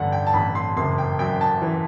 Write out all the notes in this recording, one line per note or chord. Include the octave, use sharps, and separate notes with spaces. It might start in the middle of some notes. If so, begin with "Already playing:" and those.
Already playing: A1 G2 D3 F#5
G5
A5
A1 B5
C6
F#1 C6
G5
F#2 G5
A5
E3